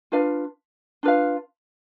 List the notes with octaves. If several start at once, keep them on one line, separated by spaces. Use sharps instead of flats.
D4 F4 B4 F5
D4 F4 B4 F5